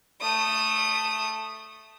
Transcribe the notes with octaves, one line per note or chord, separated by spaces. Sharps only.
A3 D#6